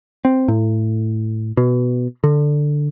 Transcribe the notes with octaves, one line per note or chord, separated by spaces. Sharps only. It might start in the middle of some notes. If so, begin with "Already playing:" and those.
C4
A2
B2
D3